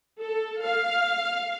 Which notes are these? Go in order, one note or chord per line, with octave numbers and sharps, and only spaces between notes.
A4
F5